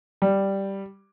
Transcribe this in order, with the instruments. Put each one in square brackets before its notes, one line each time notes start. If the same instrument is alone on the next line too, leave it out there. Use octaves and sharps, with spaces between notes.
[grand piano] G3